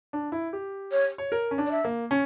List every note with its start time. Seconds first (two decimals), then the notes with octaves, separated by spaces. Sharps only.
0.13 D4
0.32 E4
0.53 G4
0.92 C#5
1.18 C#5
1.32 A#4
1.51 C#4
1.58 D4
1.66 D5
1.72 E5
1.85 A#3
2.11 C#4